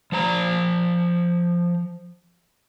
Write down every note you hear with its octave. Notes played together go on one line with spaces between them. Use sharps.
F3 C5 A#5